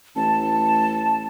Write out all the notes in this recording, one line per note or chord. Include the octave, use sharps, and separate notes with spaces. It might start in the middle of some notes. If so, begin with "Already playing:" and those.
A1 A5